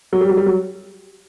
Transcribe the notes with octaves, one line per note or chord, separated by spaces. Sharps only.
F#3
G3
F#3
G3
F#3